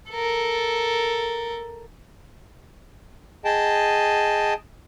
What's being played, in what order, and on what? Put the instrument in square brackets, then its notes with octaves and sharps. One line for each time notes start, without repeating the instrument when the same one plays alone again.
[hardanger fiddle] A4 A#4
[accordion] G#4 D#5 G5 A5